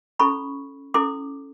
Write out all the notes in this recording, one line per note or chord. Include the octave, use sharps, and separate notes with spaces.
C#4 E4 A4 B5 C#6
C#4 E4 A4 C6 D6